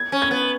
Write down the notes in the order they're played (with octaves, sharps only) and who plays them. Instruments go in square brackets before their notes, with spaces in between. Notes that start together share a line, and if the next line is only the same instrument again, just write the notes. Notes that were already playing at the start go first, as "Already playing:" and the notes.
Already playing: [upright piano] G#6
[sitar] C#4
[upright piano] G#6
[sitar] B3